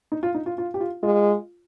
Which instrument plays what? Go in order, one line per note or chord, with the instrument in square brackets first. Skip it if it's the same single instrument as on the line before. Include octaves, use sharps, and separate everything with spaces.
[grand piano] D#4
F4
D#4
F4
F4
G4
F4
[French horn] G#3 [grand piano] F4